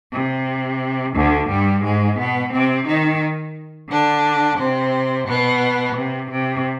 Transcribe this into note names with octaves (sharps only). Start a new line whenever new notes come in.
C3
D2 D3
G2 G3
G#2 G#3
B2 B3
C3 C4
D#3 D#4
D3 D4
C3 C4
B2 B3
C3
C3